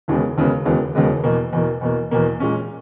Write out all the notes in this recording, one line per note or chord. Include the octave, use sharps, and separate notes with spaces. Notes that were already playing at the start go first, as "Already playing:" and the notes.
E1 D#2 C#3 G#3 B3
E1 D#2 C#3 G#3 B3
E1 D#2 C#3 G#3 B3
E1 D#2 C#3 G#3 B3
E2 B2 A#3
E2 B2 A#3
E2 B2 A#3
E2 B2 A#3
A#2 G#3 C#4